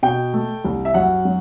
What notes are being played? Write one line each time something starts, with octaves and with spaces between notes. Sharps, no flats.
B2 G5
A3
C2
E5
F#2 F#5
F#3